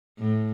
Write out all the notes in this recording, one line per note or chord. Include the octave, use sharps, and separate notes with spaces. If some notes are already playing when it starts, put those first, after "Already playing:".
A2